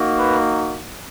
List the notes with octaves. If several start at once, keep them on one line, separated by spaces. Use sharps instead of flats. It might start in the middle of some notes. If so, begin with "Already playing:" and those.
Already playing: A#3 D#4 F#4
B4